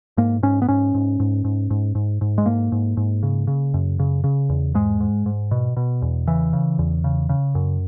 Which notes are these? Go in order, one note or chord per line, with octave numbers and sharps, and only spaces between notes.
G#2 A#3
G#2 C#4
B3
G#2 C#4
G#2
G#2
G#2
G#2
G#2
G#2
G#3
G#2 A#3
G#2
G#2
C#3
C#3
F#2
C#3
C#3
E2
G#2 G#3
G#2
G#2
B2
B2
E2
C#3 E3
C#3
E2
C#3
C#3
F#2